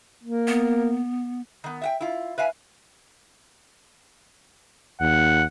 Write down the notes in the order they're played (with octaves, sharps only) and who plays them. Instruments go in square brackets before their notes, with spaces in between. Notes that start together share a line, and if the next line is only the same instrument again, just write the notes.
[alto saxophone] A#3
[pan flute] B3
[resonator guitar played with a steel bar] D#3 B3
E5 F#5 G5
E4 F4
B4 E5 F5 G#5
[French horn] D#2 [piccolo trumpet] F#5